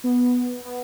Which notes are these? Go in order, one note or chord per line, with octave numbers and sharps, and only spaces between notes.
B3
B3